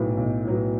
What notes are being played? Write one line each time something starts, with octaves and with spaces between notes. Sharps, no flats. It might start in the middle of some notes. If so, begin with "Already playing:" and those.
Already playing: B1 A2 F#3 B3
B1
A2 F#3 B3